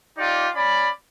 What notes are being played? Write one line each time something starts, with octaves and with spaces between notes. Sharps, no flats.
D#4 F4 G4 D5
C#4 D5 B5